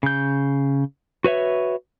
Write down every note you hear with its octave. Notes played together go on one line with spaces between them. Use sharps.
C#3 G6
F#4 B4 C#5 E5